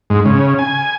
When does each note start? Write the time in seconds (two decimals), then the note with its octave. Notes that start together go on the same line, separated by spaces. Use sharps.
0.10 G#2
0.25 C#3
0.59 G#5